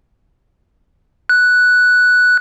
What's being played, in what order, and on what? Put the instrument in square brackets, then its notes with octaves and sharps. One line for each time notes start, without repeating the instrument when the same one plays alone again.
[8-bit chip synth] F#6